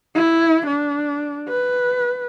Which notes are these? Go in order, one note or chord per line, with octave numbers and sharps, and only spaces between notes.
E4
D4
B4